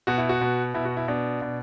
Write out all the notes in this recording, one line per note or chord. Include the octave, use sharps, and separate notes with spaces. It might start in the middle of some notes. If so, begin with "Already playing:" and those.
B2 F#4
E4
F#4
B2
B2 E4
F#4
E4
B2 D4
B2